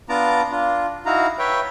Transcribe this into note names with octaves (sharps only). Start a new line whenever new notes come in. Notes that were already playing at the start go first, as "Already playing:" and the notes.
B3 D4 F4 A5 A#5 D6
D4 F4
D#4 E4 F#4 F5 A#5
B4 C#5 E5 G5